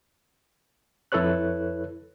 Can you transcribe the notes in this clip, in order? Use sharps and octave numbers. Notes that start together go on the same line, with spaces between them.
F2 E4 A4 B4 C#5 F#6